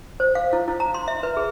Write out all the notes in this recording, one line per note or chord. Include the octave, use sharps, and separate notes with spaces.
C5
F5
E4
E4
A#5
C6
E5
B4
G#4